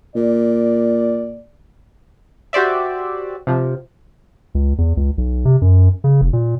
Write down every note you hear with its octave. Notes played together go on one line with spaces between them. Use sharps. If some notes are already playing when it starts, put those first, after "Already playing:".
A#2 D5
F#4 G4 C5 D5 E5
C3 F3
C#2
E2
C#2
B1
C3
F#2
C#3
F1
A#2